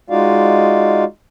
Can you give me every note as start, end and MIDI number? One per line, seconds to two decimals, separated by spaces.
0.10 1.04 56
0.10 1.04 63
0.10 1.04 65
0.10 1.04 66
0.10 1.04 74
0.10 1.04 77